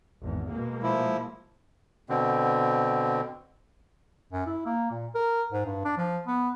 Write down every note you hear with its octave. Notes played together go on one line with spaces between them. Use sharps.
G#1 E2
B2 G#3 A#3
F3 E4
B2 D3 C4
F#2
E4
A#3
A#2
A#4
G#2
G2
D4
F3
B3